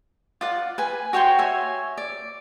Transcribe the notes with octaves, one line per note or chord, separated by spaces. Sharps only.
F4 D5 F#5
B4 G#5
F#4 C#5 G5 C6
C#5 E5 G#5
D5